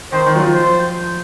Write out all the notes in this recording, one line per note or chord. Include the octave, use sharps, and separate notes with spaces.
D#3 C5
D#3
F#3
F3
C5